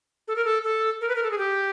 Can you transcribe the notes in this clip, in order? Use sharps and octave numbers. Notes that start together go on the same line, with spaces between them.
A4
A#4
A4
A4
A#4
B4
A#4
A4
G#4
G4